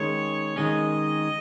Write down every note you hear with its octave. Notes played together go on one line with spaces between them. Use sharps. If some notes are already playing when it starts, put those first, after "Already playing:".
Already playing: D#3 G#3 C#4 C#5
D#3 G#3 C#4 D#5